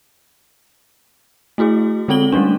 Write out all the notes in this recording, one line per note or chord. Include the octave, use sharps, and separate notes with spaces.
A3 E4 F#4 G#4
D3 G#3 C4 A4 F#7 G7
G3 A3 C#4 D4